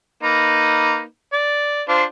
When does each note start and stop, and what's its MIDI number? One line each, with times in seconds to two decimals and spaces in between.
0.23 1.03 58
0.23 1.03 63
0.23 1.03 71
1.33 1.82 74
1.88 2.04 62
1.88 2.04 65
1.88 2.04 72